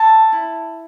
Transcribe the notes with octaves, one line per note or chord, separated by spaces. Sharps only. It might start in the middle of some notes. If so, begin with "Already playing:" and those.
Already playing: A4 A5
E4